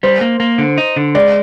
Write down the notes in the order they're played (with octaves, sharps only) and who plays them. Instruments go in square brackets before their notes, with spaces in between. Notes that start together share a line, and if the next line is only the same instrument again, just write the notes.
[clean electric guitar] G3 [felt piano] C5
[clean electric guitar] A#3
A#3
D3
D#4
D3
[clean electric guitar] G#3 [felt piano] D5